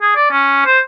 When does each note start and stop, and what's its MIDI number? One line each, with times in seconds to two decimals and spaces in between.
0.02 0.12 68
0.16 0.28 74
0.31 0.65 61
0.66 0.80 72